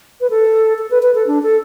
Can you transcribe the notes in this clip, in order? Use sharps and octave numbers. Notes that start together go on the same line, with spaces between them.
B4
A4
A4
B4
B4
A4
D4
A4